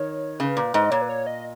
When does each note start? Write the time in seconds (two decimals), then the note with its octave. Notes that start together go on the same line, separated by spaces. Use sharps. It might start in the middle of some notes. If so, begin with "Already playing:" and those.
Already playing: D#3 C#5
0.39 C#3 B4
0.57 A#2
0.74 G#2
0.84 D#5
0.91 A#2 C#5
1.02 B4
1.09 C#5
1.27 D#5